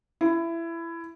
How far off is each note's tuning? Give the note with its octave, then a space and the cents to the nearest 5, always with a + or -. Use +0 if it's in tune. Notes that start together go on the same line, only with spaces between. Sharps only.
E4 +20